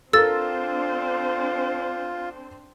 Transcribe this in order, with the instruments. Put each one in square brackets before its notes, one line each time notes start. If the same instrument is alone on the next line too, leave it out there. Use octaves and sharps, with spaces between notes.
[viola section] C4 D4 C5 [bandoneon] F4 [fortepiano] A4 A#4 [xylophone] E6 A6